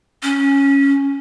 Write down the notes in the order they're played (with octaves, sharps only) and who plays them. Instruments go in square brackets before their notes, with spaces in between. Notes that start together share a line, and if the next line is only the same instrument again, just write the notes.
[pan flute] C#4